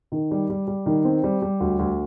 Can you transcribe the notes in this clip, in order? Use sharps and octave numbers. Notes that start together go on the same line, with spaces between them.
D#3
G3
G3
G3
D#3
C4
G3
G3
D2
D2